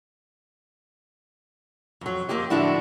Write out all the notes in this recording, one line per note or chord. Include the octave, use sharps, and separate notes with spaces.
F2 F#3
F2 C#3 A#3 C4 G4 D#5
A2 D3 F3 D4 E4 F#4